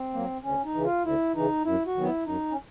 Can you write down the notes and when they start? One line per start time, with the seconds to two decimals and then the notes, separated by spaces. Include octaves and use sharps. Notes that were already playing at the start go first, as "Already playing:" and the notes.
Already playing: C4
0.14 F#3 A#3
0.44 D2 C#4
0.64 D#4
0.75 C#3 E3
0.85 F4
1.04 D2 E4
1.35 C#3 E3 D#4
1.65 F#2 E4
1.86 F#4
1.96 D#3 F#3 B3
2.06 E4
2.26 F#2 D#4
2.52 C#4